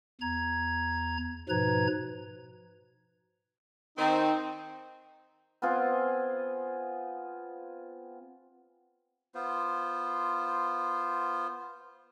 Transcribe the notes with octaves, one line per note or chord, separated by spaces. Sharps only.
E2 A#5 G#6
G#2 B2 F3 B4 A#5 G#6
D#3 C4 D#4
B3 C4 F4 G#4
B3 F4 C5